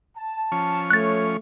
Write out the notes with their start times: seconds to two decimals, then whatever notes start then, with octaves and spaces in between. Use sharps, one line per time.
0.16 A5
0.52 F3 C#4 C#6
0.90 A3 C#5 F#6 A6